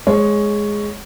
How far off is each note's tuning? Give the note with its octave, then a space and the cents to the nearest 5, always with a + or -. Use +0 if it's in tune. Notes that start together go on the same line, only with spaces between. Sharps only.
G#3 +5 C#5 +0